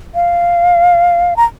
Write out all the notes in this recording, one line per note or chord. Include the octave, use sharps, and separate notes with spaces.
F5
A#5